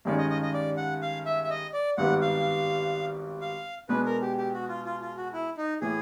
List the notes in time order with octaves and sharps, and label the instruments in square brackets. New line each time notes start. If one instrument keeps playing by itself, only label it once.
[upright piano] G2 D#3 G#3 C#4 [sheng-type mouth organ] D5
[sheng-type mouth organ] D#5
D#5
D#5
D5
F#5
F5
E5
E5
D#5
D5
[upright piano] G#1 G2 D#3 G3 B3 [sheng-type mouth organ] F#5
[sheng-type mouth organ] F5
F5
[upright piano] B2 G#3 B3 D4 [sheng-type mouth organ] B4
[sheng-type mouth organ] A#4
G4
G4
F#4
F4
F4
F4
F#4
E4
D#4
[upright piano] A2 E3 [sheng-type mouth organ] G#4